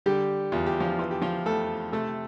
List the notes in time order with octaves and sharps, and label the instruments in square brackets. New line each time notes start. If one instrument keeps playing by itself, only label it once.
[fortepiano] D3 G3 G4
E2 F4
G4
F3 F4
E3 F4
G4
F3 F4
F2 A3 A4
C3 A3 A4